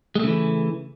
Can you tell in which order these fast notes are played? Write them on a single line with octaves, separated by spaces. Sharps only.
G#3 A3 C#3 E3